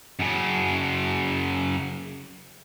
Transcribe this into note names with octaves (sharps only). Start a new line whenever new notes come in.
F#2 C#3